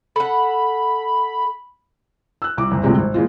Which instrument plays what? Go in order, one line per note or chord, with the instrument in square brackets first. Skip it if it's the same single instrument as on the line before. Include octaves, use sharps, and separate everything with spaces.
[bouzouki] A4 F#5 [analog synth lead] B5
[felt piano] E6 F#6
C2 D6
F#1 C2
D2 A2 C3 F3 G3 G#3
G#1
A#2 E3 G#3 F4